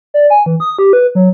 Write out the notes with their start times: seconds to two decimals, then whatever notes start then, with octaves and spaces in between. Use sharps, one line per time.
0.14 D5
0.30 G#5
0.46 E3
0.60 D#6
0.79 G4
0.93 B4
1.15 F#3